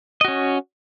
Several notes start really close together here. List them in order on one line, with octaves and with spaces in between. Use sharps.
D#5 F#4 C#4